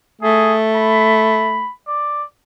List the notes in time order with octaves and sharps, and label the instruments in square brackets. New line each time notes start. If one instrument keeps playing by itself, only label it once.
[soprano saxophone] A3 [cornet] G#4
[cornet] B5
D5